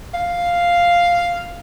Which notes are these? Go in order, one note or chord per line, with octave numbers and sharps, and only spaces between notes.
F5